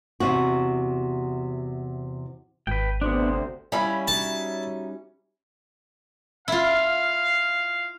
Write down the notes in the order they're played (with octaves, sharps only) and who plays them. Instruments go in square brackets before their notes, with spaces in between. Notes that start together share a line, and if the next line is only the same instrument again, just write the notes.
[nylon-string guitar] E2 C3 F#4
[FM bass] G#1 [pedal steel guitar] B4 G5
[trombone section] D2 C3 C5 [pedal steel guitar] B3 D4
[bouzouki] G3 C#4 [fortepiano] E4 B5 [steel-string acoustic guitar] C#5 F5
[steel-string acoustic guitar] D#4 F#4 E5 [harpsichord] A5
[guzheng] E4 F4 [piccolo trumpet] F5